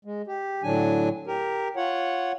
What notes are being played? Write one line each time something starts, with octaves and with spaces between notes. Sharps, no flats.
G#3
G4
A2 D3 F#3 D4 G#5
G4 A#4
F4 C#5 F#5